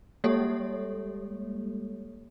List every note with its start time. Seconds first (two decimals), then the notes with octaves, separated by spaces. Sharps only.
0.24 G3 G#3 A#3 G4 A4 C#5